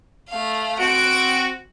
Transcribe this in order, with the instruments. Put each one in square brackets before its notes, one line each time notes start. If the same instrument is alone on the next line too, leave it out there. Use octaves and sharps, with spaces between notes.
[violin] A3 F5
[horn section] C4 F#4 [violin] D7